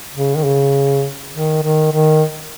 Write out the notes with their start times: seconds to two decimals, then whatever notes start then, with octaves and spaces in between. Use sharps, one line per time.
0.15 C#3
0.37 D#3
0.44 C#3
1.33 D#3
1.63 D#3
1.92 D#3